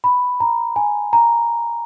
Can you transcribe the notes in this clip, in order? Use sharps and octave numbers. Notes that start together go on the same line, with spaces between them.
B5
A#5
G#5
A#5